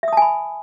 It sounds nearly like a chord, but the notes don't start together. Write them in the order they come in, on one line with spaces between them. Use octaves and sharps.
E5 D#6 A5 G#5 B5